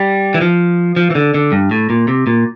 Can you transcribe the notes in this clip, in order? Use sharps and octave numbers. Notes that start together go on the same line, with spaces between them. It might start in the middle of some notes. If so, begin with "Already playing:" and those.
Already playing: G3
E3
F3
F3
E3
D3
D3
G2
A2
A#2
C3
A#2